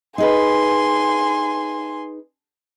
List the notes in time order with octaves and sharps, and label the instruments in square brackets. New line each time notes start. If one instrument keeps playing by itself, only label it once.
[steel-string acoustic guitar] D#4 G#4 B4 [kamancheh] G#5 C6